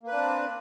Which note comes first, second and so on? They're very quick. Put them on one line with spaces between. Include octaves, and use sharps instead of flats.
A#3 B4 D4 C4